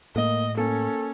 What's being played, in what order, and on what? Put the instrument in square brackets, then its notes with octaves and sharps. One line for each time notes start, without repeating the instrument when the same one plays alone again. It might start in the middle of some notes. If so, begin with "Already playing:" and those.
[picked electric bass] A2 [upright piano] A#3 [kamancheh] D#5
[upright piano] A#3 [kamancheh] C#4 [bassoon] A4